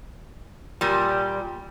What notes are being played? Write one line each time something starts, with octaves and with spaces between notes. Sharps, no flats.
A#2 G3